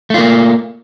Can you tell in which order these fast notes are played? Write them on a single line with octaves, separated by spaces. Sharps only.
A3 F4 A#3